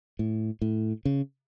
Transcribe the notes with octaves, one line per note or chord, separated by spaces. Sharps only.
A2
A2
C#3